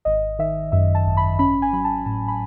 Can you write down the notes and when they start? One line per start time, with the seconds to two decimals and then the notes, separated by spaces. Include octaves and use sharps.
0.05 G#1 D#5
0.39 D#3 E5
0.72 F#2 E5
0.95 A5
1.06 G#1
1.17 B5
1.39 C#4 B5
1.62 G#5
1.73 F#3 B5
1.84 A5
2.06 A2 A5
2.28 B5